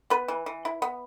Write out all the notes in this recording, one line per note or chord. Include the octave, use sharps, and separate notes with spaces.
B3 B4
E3
E3
E4
B3